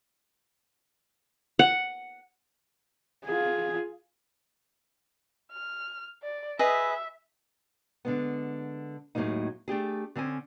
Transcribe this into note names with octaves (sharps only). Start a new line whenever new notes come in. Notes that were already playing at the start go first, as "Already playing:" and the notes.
F#5
F4 G#4
F6
D5
G#4 B4 D#5 E5
D3 G#3 B3
D#2 A2 F#3 G#3 A#3 D#4
A3 D4 G4 G#4
D3 C4 C#4 G#5